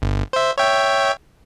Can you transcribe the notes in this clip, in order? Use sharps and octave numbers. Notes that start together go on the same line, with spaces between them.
G1
C5 E5
C#5 E5 G5